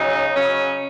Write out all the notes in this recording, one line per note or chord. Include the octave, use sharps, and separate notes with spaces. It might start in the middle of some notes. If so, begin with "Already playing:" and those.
Already playing: C#3 F#3 D#4
C#3 F#3 C#4